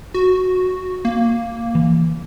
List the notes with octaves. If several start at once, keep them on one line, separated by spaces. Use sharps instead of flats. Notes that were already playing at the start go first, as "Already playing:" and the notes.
F#4
A#3
E3